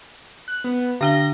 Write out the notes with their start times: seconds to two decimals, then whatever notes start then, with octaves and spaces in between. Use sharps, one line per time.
0.48 F#6
0.64 B3
1.01 D3 D4 A#6 G7